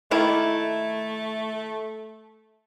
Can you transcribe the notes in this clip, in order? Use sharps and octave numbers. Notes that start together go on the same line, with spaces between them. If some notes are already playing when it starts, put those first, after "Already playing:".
D#3 A3 A#3 E4